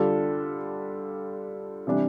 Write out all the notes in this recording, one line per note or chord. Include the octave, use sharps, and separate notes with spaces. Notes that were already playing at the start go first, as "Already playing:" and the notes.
Already playing: D3 G3 D4 F4 A4
C3 E3 G3 D4